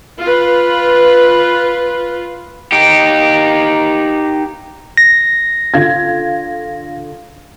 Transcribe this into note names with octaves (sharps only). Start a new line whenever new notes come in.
F4 B4
D#4 G4
A#6
D3 F4 G#6